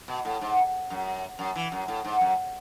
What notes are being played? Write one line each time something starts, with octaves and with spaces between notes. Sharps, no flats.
B2
A2
G#2
F#2
F#2
E3
F#2
A2
G#2
F#2